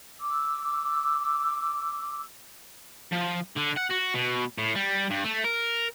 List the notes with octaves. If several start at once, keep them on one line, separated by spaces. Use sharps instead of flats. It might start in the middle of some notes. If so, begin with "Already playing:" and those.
D6 E6
F3
D3
F#5
F#4
B2
A2
G3
G2
A3
A#4